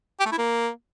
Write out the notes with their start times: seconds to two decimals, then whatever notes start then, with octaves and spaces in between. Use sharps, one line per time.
0.20 G4
0.26 A3
0.32 E4
0.38 A#3